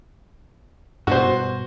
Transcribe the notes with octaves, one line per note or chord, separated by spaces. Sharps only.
G2 B2 F#4 C5